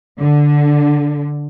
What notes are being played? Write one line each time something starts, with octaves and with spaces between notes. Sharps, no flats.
D3